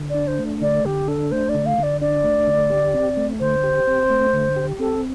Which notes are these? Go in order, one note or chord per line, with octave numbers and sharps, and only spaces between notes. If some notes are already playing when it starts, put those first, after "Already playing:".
Already playing: D3
D4 D5
C5
A3
D3 D5
D3 G4
D4 A4
A3 C5
D5
D3
F5
D3
D5
D4 D5
A3
D3
G4
C4
A3
D3 C5
G4
C4
A3
D3
G4
C4 A4